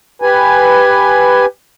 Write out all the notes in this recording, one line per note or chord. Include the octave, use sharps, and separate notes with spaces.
G4 B4 G#5